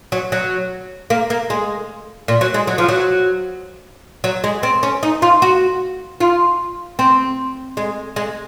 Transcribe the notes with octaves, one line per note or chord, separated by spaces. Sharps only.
F#3
F#3
A#3
A#3
G#3
A#2
F#3
G#3
F#3
F3
F#3
F#3
G#3
C4
C#4
D#4
F4
F#4
F4
C4
G#3
G#3